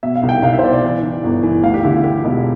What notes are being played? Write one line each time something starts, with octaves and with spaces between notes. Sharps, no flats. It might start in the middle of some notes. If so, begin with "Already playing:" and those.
B2 E5
F5
C2
G5
C2 F5
E5
C5
B2 D5
D5
E3
E3
G1
E3
D2 F5
G4
D3 E4
F4
D3 G4
E1